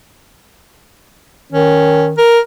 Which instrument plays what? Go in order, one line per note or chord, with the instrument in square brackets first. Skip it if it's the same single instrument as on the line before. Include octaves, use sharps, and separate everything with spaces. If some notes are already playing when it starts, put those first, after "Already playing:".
[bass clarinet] D#3 [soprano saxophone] C#4
[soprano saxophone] A#4